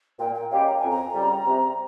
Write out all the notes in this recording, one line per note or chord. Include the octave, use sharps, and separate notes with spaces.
A#2 G5
G5
G#3 C#4 G4 F5
A#5
F2 G#5
A#5
C#3 G3
C3